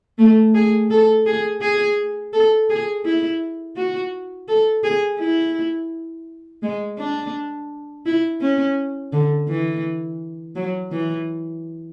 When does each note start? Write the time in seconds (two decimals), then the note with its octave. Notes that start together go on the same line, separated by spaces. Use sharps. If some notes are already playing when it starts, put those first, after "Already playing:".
0.18 A3
0.54 G#4
0.90 A4
1.26 G#4
1.61 G#4
2.33 A4
2.70 G#4
3.05 E4
3.76 F#4
4.48 A4
4.84 G#4
5.19 E4
6.63 G#3
6.98 D4
8.06 E4
8.41 C#4
9.13 D3
9.48 E3
10.56 F#3
10.92 E3